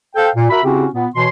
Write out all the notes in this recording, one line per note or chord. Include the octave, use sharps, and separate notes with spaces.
A4 C5 F5 G5
A#2
F#4 A#4 E5 B5
C#3 C4 C#4 E4 F#4 G4
A#2 B3
B2 E3 C#5 C6